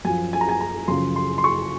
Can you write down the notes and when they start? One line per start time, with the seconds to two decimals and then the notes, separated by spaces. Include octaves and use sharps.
0.05 F#2 F3 G#5
0.33 G#5
0.41 A#5
0.49 G#5
0.61 A#5
0.88 F#2 C#3 F3 C6
1.16 C6
1.38 C6
1.44 C#6